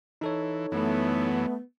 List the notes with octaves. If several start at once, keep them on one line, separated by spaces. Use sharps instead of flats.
E3 D#4 A4 C#5
F#2 E3 A3 B3